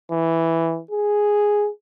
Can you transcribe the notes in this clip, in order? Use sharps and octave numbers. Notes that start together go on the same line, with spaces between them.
E3
G#4